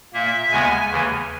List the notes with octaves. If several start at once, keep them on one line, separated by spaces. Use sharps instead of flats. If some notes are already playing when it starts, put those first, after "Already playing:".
A#2 A#3 E5
D#2 C#3 G#3 B3 G#5
D#2 C#3 E3